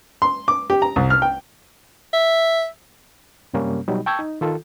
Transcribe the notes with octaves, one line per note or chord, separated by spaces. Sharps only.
C6
D6
G4
A#5
C2
F6
G5
E5
F#2 C3 G3 A#3 C#4
B2 F#3 G3 D#4
G5 A5 C#6 E6 G6 G#6
D#4
D#3 F4 A4